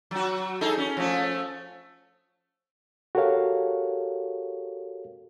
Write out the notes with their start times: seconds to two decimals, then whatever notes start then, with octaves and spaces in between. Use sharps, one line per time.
0.11 F#3 F#4
0.61 D#4 G#4 A4
0.78 C#4
0.97 F3 A3 C#4
3.15 F#4 G4 A4 A#4 C#5 F5